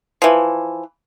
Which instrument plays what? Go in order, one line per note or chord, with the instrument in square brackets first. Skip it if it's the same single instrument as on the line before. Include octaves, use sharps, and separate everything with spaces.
[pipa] E3 F3